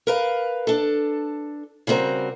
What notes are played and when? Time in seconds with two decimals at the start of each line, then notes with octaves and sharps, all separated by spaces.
0.07 A#4 B4 F5
0.67 D4 A4
1.87 C#3 G3 C4 F#4 A#4